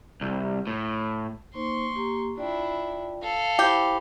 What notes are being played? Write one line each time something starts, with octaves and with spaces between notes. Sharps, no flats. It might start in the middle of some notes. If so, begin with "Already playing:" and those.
C2
A2
A#3 D#4 C5 C6 C#6
A#3 G4 A#5
D4 E4 F4 D5 G5
A4 F5
E4 G4 C5 B5